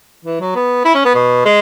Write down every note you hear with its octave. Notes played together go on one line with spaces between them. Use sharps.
E3
F#3
B3
E4
C#4
B3
B2
G#3